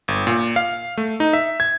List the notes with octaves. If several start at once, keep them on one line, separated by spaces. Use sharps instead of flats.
G1
A#2
F5
A3
D#4
E5
G#6